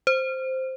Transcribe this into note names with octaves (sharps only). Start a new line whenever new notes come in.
C5